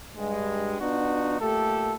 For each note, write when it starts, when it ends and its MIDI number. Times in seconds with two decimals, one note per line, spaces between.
0.16 0.79 43
0.16 0.79 56
0.80 1.38 59
0.80 1.38 62
0.80 1.38 63
0.80 1.38 65
0.80 1.38 66
1.39 1.94 46
1.39 1.94 57
1.39 1.94 67
1.39 1.94 69